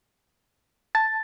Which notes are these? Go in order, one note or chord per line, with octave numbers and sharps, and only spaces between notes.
A5 A6